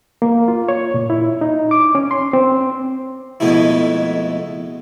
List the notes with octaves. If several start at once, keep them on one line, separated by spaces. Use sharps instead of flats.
A#3
F4
C#5
A#2
E4
D#4
D6
C#4
C6
C4
F2 B2 G#3 A3 E4